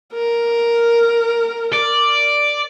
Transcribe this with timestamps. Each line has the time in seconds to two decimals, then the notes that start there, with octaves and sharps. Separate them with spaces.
0.14 A#4
1.73 D5